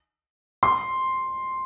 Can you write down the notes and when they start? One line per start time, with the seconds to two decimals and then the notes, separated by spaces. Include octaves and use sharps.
0.63 C6